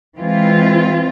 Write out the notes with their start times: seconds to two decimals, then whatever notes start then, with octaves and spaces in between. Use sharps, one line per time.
0.19 E3 G#3 C4 F4